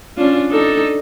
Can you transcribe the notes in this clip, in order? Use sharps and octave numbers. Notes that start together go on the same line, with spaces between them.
C#4 D4 F4
D4 D#4 A4